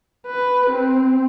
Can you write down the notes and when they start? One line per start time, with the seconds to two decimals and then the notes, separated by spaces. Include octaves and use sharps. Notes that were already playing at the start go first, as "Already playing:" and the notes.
0.27 B4
0.71 C4